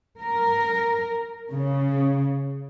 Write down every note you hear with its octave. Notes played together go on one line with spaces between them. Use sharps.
A#4
C#3